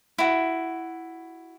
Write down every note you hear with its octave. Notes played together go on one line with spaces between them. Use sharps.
E4 F#4